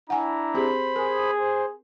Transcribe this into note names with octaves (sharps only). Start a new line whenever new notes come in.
D4 E4 F#5 G#5 A#5
C4 G4 G#4 C5 B5
G#4 A#4
C5